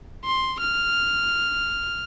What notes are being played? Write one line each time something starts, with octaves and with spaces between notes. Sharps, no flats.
C6
F6